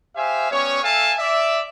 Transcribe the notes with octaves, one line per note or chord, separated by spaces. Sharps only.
G4 C5 E5 F5 G#5
G3 B3 C#4 C#5
A4 E5 F5 G#5 A5
D5 E5